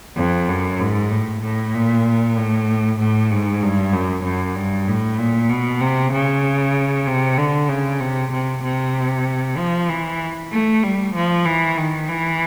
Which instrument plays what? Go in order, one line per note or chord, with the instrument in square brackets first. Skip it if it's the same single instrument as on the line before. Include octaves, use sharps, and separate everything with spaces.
[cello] F2
F#2
G#2
A2
A2
A#2
A2
A2
G#2
G2
F#2
F#2
G2
A2
A#2
B2
C3
C#3
C3
D3
C#3
C3
C3
C3
F3
E3
A3
G3
F3
E3
D#3
E3